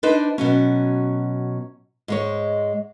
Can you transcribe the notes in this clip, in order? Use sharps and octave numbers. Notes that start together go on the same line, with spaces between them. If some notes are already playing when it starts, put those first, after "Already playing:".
D4 D#4 B4 C5
B2 F#3 C#4
G#2 G#3 C#5